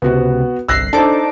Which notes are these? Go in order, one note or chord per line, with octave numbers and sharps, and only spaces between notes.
C#2 C3 B3 F#4
G1 C2 E6 F#6 A#6 C7
D4 D#4 A4 C5 A5 D6